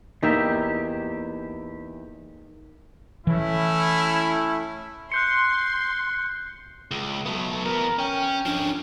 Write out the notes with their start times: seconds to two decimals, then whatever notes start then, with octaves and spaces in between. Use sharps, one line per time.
0.23 E2 A#3 D#4 G4 E5 A#5
3.27 E3 A3 C#4 E4
5.12 C6 F#6 G6 C#7
6.91 C#2
7.26 F#3 A3 B3
7.65 E2 B3 A#4
7.99 C#4 G5
8.46 F3 C#4 D4